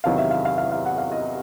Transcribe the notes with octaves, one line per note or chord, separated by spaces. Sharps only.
E2 C3 D#3 F#3 F5
E5
F5
F5
F5
F5
F#5
F5
D#5